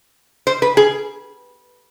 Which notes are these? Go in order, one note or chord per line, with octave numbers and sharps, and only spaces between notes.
C5
B4
G#4